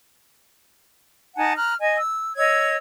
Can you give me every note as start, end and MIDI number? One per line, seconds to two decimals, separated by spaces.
1.36 1.53 63
1.36 1.53 78
1.36 1.53 80
1.36 1.53 81
1.56 1.74 82
1.56 1.74 89
1.56 1.74 90
1.79 1.96 75
1.79 1.96 80
1.96 2.35 88
2.36 2.76 73
2.36 2.76 75
2.36 2.76 88
2.36 2.76 92